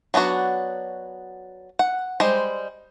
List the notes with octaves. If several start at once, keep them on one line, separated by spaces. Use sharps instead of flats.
F#3 B3 D4 F#4
F#5
G3 G#3 C5